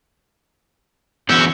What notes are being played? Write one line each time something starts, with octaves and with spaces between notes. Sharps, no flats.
D3 E3 B3 C#4 F#4 E6 G6